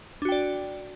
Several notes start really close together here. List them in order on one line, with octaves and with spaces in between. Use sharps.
D4 F#4 G5 D5